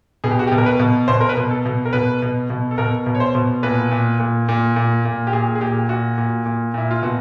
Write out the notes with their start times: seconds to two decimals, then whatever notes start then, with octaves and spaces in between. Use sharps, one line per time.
0.24 B2 G#4
0.31 G4
0.39 F#4
0.47 G4
0.52 B2
0.58 A#4
0.66 B4
0.79 B2
1.08 B2 C5
1.21 A#4
1.29 B4
1.37 B2
1.51 A4
1.65 B2
1.85 A#4
1.93 B2 B4
2.22 B2
2.50 B2
2.71 A4
2.78 B2 A#4
3.06 B2
3.15 C#5
3.20 C5
3.35 B2
3.63 A#2 B4
3.91 A#2
4.20 A#2
4.49 A#2
4.76 A#2
5.05 A#2
5.27 G4
5.33 A#2 G#4
5.55 G#4
5.61 A#2 G4
5.89 A#2 F#4
6.18 A#2
6.46 A#2
6.74 A#2 E4
6.91 F4
7.02 B2 F#4